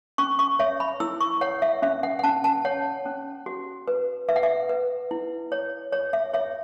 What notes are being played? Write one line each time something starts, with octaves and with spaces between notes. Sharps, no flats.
C#4 C#6
C#6
C#5 E5
B5
E4 E6
C#6
C#5 F#5
E5
C#4 E5
F#5
F#5
C#4 A5
A5
C#5 F#5
C#4
F#4
B4
B4 E5
F#5
E5
B4
E4
C#5
C#5
E5
C#5 E5